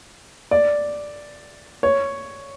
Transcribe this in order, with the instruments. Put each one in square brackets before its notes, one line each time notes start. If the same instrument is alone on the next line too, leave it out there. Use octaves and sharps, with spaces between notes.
[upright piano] D5
C#5